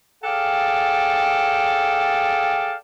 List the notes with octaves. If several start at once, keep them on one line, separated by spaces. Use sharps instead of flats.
G#4 A4 D5 F5 G5